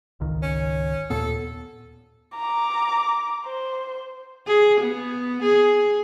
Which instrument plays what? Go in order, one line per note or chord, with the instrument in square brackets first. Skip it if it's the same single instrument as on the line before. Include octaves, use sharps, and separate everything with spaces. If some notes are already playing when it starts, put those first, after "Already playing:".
[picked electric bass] G#1 C#2 D#3
[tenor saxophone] C#4
[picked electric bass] D#2 A#2 B3 [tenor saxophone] A4
[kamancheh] A#5 D6
C5
[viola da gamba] G#4
B3
G#4